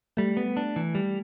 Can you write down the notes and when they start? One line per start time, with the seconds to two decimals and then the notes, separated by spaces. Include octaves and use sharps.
0.17 G3 A3
0.37 B3
0.57 D4
0.76 E3
0.95 G3